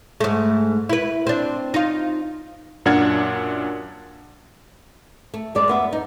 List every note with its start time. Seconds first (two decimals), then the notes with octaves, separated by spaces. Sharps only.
0.20 G#2 A3
0.89 E4 B4
1.27 C4 D4
1.74 D#4 F4
2.85 F#2 A#2 D4 F#5 F6 G#6
5.34 A3
5.55 G2 G#3 D5
5.68 F#2 B3 E5
5.93 D#4